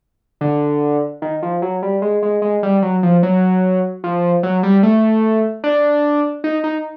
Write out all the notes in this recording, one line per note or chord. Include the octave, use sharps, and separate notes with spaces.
D3
D#3
F3
F#3
G3
G#3
G#3
G#3
G3
F#3
F3
F#3
F3
F#3
G3
A3
D4
D#4
D#4